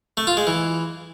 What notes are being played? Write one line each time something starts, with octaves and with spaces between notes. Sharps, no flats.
A3
F4
G#3
E3